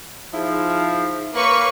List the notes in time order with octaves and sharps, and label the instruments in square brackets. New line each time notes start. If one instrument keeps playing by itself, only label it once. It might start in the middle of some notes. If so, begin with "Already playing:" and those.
[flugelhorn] F3 [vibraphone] D#4 G#4 [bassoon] E4
[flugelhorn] A#3 [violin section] B4 C#5 C#6